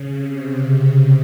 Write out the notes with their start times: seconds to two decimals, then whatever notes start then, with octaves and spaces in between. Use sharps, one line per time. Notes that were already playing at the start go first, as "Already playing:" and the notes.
Already playing: C#3
0.12 C3